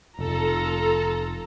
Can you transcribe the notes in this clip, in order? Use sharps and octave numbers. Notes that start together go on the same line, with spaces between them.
F1 F4 A4 A#5